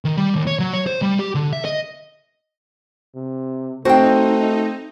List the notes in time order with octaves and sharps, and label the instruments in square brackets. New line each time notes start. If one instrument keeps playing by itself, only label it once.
[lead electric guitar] D#3
G3
D#2
C#5
F#3
C#5
C5
G3
G4
D3
E5
D#5
[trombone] C3
[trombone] A3 [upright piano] C4 C5 [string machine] D#4 [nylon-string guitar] F#4 G5